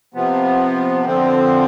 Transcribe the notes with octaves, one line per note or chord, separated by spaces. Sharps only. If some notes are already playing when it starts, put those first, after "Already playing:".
C3 F3 B3
D3 F3 C4